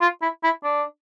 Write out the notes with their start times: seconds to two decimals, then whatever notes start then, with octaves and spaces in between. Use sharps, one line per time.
0.01 F4
0.22 E4
0.43 E4
0.63 D4